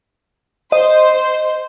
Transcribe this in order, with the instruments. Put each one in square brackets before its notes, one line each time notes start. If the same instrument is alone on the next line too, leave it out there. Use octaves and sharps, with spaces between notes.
[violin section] C5 [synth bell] D#5